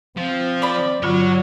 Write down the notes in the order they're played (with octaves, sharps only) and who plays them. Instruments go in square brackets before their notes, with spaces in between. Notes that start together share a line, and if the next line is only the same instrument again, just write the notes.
[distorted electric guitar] F3 [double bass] C4
[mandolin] D5 B5
[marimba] G2 D3 F4 [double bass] F#3 [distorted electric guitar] F#4 C#5